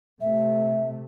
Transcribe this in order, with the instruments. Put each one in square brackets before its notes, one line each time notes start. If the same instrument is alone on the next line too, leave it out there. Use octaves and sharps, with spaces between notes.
[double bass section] C3 A3 [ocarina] E5